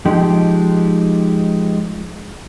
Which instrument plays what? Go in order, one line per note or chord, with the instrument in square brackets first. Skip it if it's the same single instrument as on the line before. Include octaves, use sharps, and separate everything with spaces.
[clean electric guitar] F3 G#3 D#4 G4